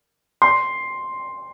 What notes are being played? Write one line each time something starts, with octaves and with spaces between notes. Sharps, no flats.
C6